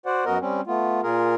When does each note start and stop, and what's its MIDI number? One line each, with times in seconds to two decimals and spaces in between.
0.06 0.25 66
0.06 0.25 72
0.06 0.25 74
0.06 0.25 78
0.25 0.38 42
0.25 0.38 59
0.25 0.38 66
0.25 0.38 70
0.25 0.38 75
0.41 0.61 55
0.41 0.61 60
0.41 0.61 61
0.67 1.01 57
0.67 1.01 59
0.67 1.01 65
1.03 1.35 46
1.03 1.35 65
1.03 1.35 68
1.03 1.35 70